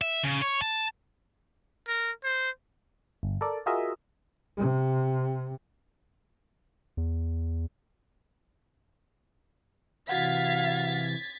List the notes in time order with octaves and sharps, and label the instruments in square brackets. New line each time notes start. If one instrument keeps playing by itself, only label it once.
[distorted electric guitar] E5
C#3
C#5
A5
[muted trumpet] A#4
C5
[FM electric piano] G1
A4 A#4 D5
F4 F#4 G#4 A#4 D#5 E5
[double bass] C3
[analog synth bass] E2
[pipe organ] C3 E3 [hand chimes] F#4 F#5 [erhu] F5 [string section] G#6 A6 B6